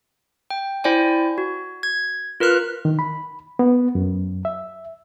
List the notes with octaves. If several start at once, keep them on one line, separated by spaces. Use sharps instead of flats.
G5
E4 C5 D5 G5 G#5
F#4
G#6
F4 A#4 B4 F6 F#6
D#3
B5
B3
F#2
E5